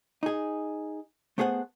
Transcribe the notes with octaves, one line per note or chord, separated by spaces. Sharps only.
D#4 G#4
A3 B3 G#4 C5 F#5